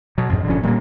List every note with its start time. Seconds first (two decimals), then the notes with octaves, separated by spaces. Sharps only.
0.18 B2 F#3
0.29 F2 G#2
0.47 D#1 D3 F3 C#4
0.63 A#2 G3 A3 A#3